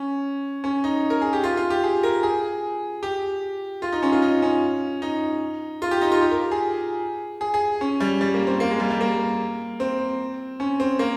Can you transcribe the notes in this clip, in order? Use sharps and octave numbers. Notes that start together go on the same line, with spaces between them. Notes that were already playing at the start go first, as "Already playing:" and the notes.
Already playing: C#4
C#4
D#4
A#4
G#4
G4
F4
F4
G4
G#4
A#4
G#4
G4
F4
D#4
C#4
F4
D#4
C#4
D#4
F4
G4
D#4
F4
G4
A#4
G#4
G#4
G#4
C#4
G3
G3
A#3
C4
A#3
G#3
G3
G3
A#3
C4
C#4
C4
A#3